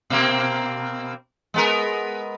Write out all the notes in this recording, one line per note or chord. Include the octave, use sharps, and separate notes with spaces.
B2 A#3 C4
G#3 B3 A#4